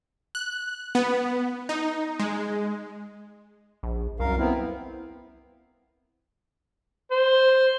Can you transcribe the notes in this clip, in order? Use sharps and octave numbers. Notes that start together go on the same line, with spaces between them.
F#6
B3
D#4
G#3
A#1
C2 F#2 A#4 F5
B3 C4 E4
C5